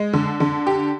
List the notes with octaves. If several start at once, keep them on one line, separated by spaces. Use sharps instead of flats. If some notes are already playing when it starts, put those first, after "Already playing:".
Already playing: G#3
D3
D3
G4